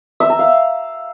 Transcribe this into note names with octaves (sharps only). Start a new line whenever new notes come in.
E5
A#5
F5